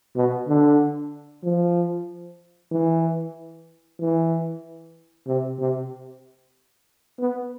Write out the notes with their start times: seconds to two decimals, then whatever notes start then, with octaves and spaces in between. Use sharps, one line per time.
0.16 B2
0.48 D3
1.43 F3
2.71 E3
4.00 E3
5.27 C3
5.59 C3
7.19 B3